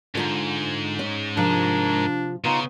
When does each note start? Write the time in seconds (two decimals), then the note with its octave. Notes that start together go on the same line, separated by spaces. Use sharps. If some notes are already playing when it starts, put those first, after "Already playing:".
0.15 G#2 D3 F4 A#5
0.99 C#4
1.37 C3 F3 D4 F4 A#4
2.45 C#3 B3 D#4 F4